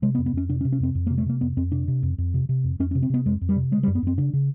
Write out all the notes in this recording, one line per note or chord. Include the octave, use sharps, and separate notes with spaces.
C3 G#3
B3
F2
B3
F2 C#4
C3 D4
C#4
C3
C#4
F2 C4
F2
A#3
C3
A3
C3 A#3
F2 B3
F2 C4
C3 D4
C3
F2
F2
C3
C3
F2
F2 C#4
C#4
C3
C4
C3 B3
F2 G#3
F2
G3
C3
C#3 G#3
G3
F#2
B3
F#2 C4
C#3 D4
C#3